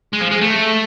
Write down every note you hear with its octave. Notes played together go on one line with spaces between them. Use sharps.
G#3
F3
G#3
A3